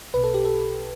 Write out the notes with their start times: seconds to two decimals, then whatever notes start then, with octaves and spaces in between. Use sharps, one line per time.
0.14 B1 B2 B4
0.24 A4
0.34 G4
0.45 A4